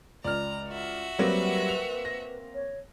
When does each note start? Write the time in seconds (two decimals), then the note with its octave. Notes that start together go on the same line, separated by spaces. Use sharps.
0.24 C#2 D5 A#5 F6
0.69 F#4 E5
1.19 F#3 G3 A#3 C4 B4
1.69 F7
2.05 A#6
2.55 C#5